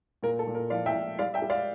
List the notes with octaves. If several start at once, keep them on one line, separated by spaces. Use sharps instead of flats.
A#2 A#4
A4
A#2
A#4
F3 D5 F5
E5 G5
A#2
G3 D5 F5
E5 G5
G3
D5 F5